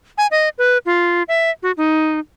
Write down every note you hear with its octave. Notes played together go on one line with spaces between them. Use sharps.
G#5
D#5
B4
F4
E5
F#4
D#4